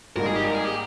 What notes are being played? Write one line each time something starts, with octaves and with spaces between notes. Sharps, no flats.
G#1 G#2 G3 A#3 D#4 A#4
G#4
G4
A#4
G#4
G4